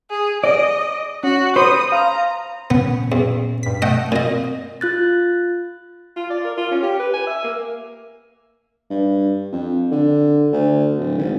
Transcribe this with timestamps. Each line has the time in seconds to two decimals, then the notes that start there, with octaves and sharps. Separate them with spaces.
0.11 G#4
0.44 D5 D#5
1.23 C#4 F#4
1.56 C5 B5 D#6
1.92 F5 A#5
2.70 A#2 B3 C#4
3.12 E2
3.63 G2 B6
3.82 A3 D#5 F#5 G5
4.12 A#2 C4 D#5
4.81 F4 F#6 A6
6.17 F4
6.30 D5
6.44 A#4
6.57 F4
6.71 C#4
6.83 G4
7.00 B4
7.13 G#5
7.27 E5
7.44 A#3
8.90 G2
9.52 F2
9.91 D3
10.52 D2
10.98 D1
11.18 G#1